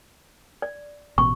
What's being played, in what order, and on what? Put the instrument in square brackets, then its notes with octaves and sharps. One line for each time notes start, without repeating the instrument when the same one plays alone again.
[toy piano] D5
[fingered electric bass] A1 B2 [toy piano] C#6